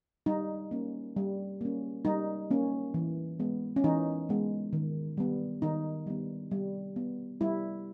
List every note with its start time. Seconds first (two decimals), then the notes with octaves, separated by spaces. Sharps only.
0.26 G3 D#4
0.71 A#3 C#4
1.17 G3
1.61 A#3 C#4
2.05 G3 D#4
2.51 A#3 C#4
2.94 E3
3.39 G#3 B3
3.76 C#4
3.84 E3 D#4
4.29 G#3 B3
4.73 D#3
5.17 G3 B3
5.62 D#3 D#4
6.07 G3 B3
6.51 G3
6.96 B3
7.41 G3 E4